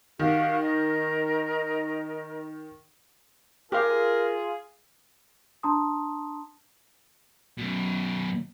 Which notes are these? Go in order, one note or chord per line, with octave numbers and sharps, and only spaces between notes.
D#3 F#4 G4 F5
A#4 D#5
F4 G4 G#4 A#4 F5
D4 A5 A#5 C6 D#6
F#2 B2